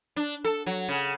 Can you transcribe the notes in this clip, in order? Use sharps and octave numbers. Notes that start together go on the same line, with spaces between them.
D4
A4
F#3
C#3